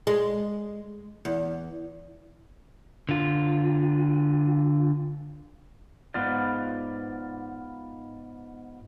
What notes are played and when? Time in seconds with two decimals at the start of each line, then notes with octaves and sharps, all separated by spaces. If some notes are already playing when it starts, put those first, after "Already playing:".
0.07 G#3
1.25 E2
3.09 D3 F4
6.14 G#2 B3 F4 D5